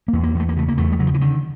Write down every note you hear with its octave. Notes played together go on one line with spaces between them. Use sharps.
E2 A#3
A#3
E2 A3
A#3
C#3 A3
A#3
E2 A3
G3
C#3 F#3
F3
E3
D3 D#3